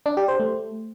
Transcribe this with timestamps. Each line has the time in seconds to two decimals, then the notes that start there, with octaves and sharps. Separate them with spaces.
0.06 D4
0.17 G4
0.28 C5
0.40 A3